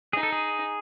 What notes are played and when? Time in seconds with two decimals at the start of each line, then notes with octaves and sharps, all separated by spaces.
0.13 D#4 G#4
0.23 A4
0.32 G#4